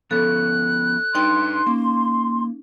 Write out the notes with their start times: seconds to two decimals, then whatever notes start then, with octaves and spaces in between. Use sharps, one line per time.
0.11 F3 B3 C#4 A4 F#6
1.15 D4 D#4 B4 D5 G5 C6
1.67 A#3 C#4